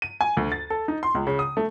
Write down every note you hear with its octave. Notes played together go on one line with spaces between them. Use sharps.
D#7
G#5
D2
A6
A4
D#4
C6
C#2
C#3
D#6
A3